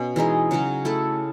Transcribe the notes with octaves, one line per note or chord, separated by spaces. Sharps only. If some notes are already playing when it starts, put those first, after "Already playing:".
Already playing: B2 C#4
E3 G#3 D#4 G#4
C#3 F#3 C#4 F#4
A3 E4 A4